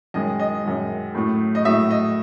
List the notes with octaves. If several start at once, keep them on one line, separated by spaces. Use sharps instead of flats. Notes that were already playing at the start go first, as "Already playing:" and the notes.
F#2 D#3 G#3 D#5
D#5
F#2 D#3 G#3
A2 F#3 A3
D#5
A2 F#3 A3 E5
D#5